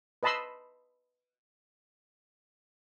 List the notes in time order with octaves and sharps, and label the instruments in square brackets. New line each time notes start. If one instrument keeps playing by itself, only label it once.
[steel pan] B4 D#5 A5 B5 C6 E6